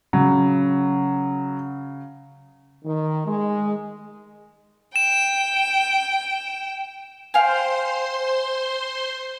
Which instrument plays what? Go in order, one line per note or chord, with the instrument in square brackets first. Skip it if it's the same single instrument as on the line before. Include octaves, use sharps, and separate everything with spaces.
[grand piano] C#3 [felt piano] F#3
[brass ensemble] D#3
G#3
[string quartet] G5 [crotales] E7
[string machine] C5 C6 [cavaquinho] F5 G5 G#5